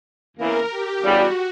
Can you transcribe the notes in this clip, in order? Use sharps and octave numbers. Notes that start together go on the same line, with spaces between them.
E2 C#3 E3 A#3 A#4
G4
E2 C#3 G3 F#4